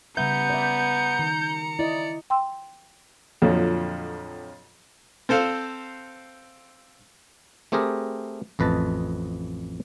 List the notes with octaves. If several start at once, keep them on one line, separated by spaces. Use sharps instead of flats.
C#3 G3 B3 E5 A#5 G6 C#7
D5 E5
D#3
E4 D5 D#5
G5 C6 E6
F2 A#2 D3 F3 F#3
C4 A4 C5 F5
A3 C4 G4 G#4 A#4
A1 F2 B4 D#5 A5